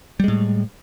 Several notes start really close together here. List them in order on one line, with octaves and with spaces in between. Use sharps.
G3 G#3 A2